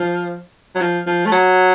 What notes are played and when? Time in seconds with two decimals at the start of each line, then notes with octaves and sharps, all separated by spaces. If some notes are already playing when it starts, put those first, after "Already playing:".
Already playing: F3
0.75 F#3
0.81 F3
1.07 F3
1.26 A3
1.32 F#3